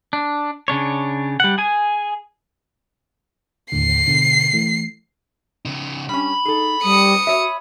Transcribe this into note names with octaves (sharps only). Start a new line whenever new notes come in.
D4
C#3 D4 C#5
G3 F#5
G#4 G#5
D#2 A2 D3 C7
B2 D3
E3 A3
C#3 D#4
G3 C#4 D4 B5
D#4 G#4 A4
G3 D#6 C#7
F#4 C#5 E5